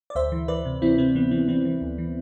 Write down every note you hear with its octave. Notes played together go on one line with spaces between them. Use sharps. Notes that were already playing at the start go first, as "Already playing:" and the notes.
D5
D2 C5 E5
E3
E3 B4 D5
C3
E3 C4 E4
C3 C4
E3 B3
E3 C4
E3 C4
E3
D2
E3